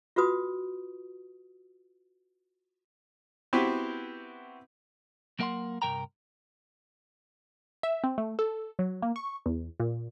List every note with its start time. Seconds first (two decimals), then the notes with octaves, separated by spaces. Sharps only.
0.16 F4 F#4 B4 D#6
3.53 B3 C4 E4 F#4 G4 B4
5.39 F#3 A#3 A#4 F5 F#5 C6
5.82 C2 G2 D#3 A#4 G5 A#5
7.83 E5
8.04 C4
8.18 A3
8.39 A4
8.79 F#3
9.02 A#3
9.16 C#6
9.46 E2
9.80 A#2